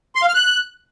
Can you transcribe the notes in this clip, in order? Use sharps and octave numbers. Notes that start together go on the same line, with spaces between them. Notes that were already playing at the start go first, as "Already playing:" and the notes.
C6
F5
F6
F#6